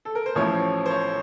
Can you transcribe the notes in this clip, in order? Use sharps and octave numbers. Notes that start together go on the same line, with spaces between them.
A4
A#4
C5
A1 A2 F3 C#5
C5
C#5